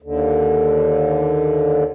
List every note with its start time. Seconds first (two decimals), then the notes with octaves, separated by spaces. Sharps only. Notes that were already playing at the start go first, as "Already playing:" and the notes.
0.02 D#2 D3